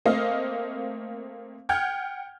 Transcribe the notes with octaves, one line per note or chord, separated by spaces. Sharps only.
A3 A#3 C4 D#5 F5
F#5 G5 F6 G6 G#6